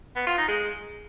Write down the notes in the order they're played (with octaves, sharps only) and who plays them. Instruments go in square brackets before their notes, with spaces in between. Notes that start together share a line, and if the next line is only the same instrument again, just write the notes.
[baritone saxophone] B3
F4
D#4
G#3